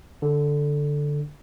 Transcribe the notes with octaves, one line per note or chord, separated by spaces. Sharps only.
D3